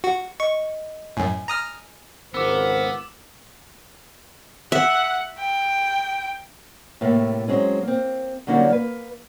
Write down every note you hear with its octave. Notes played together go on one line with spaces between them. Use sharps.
F#4
D#5 C#6
F#2 A2 G#5
A#5 D#6 F6
G#1 C#2 B3 A#4 C5 D6 E6
E5 F#5
G5
A2 C3 A3 A#3
F#3 G#3 C4 C#4
A#3 C4
D3 F#3 G3 A#3 C#4 D#4
A#3 B4